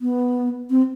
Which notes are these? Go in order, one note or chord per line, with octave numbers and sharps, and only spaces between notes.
B3
C4